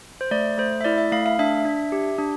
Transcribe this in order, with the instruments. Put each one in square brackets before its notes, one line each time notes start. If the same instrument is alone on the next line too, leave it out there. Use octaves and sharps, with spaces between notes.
[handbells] C5
A3 D5
A3 C5
E5
E4 D5
E5
A3 F5
F5
D4 E5
D4
G4
D4